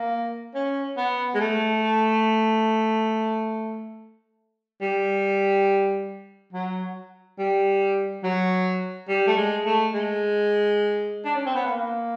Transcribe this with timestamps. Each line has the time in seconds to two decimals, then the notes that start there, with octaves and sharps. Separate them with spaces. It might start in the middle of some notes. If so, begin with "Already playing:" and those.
Already playing: A#3
0.55 C#4
0.98 B3
1.35 G#3
1.41 A3
4.82 G3
6.53 F#3
7.39 G3
8.24 F#3
9.09 G3
9.27 A3
9.37 G#3
9.66 A3
9.94 G#3
11.25 D4
11.35 C#4
11.46 C4
11.55 B3
11.66 A#3